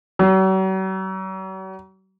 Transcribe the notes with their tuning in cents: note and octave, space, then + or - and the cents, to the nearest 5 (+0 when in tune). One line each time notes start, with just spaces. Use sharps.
F#3 +45